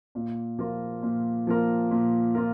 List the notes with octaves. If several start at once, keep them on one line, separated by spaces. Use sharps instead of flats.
A#2
F3 A#3 F4 A#4
A#2
F3 A#3 F4 A#4
A#2
A#3 F4 A#4